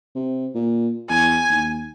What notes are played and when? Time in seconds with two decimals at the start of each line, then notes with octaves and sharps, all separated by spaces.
0.15 C3
0.55 A#2
1.09 E2 G#5
1.49 D#2